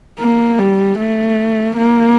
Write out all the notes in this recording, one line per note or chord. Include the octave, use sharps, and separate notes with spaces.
A#3
G3
A3
A#3